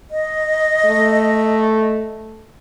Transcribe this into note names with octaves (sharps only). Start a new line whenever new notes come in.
D#5
A3